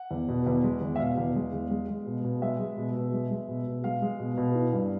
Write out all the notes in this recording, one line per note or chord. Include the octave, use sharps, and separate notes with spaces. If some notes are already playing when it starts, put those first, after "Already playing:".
Already playing: F#5
E2
B2
E2
G#3
E2
E5
B2 F5
E2
G#3
E2
G#3
G#3
B2
B2
G#3 E5
G#3
B2
B2
G#3
G#3
B2
B2
G#3 F5
G#3
B2
B2
E3
G2